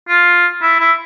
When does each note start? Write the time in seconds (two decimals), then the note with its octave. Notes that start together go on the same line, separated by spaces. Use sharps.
0.09 F4
0.62 E4
0.80 E4